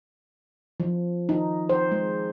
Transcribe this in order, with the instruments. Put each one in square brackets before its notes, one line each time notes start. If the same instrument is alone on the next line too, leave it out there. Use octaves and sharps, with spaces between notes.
[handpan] F3
D#4
C5
G#3